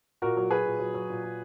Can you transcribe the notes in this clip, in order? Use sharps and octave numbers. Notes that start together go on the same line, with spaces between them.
A#2 F#4 A#4
F#3
F#3 G#4 B4
A#2
F#3
F#3
A#2
F#3